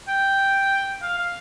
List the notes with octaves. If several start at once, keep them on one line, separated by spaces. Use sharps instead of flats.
G5
F5
F5